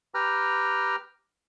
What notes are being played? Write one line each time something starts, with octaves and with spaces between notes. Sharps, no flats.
G4 B4 G5 A#5 F6